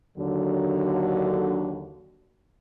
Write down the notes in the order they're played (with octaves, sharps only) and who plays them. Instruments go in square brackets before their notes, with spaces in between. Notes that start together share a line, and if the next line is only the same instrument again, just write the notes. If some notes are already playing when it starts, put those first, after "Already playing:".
[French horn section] D#2 D3 F#3